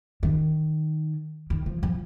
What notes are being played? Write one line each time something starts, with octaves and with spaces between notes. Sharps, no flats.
D#3
D#3
F3
F3